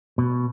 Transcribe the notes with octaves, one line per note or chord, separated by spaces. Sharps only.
B2